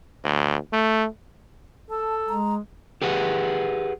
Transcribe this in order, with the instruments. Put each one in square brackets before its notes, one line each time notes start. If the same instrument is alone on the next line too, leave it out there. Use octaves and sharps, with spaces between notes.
[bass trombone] D2
A3
[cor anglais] A4 [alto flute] A5
[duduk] G#3 [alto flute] A#5
[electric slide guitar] G4 G#4 B4 F#5